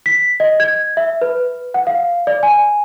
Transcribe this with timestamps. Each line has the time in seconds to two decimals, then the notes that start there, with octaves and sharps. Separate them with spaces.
0.06 B6
0.40 D#5
0.60 G#6
0.97 E5
1.21 B4
1.74 F#5
1.87 F5
2.27 D5
2.43 G#5